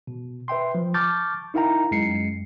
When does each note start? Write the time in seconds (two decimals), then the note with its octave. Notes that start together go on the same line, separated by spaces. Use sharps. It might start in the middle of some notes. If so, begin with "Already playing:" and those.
0.07 B2
0.48 B4 E5 G5 C6
0.75 F3
0.94 A5 C#6 D6 F6 G6 A6
1.54 D#4 E4 A#4 F5 G5 A#5
1.91 F#2 G#3 C7 C#7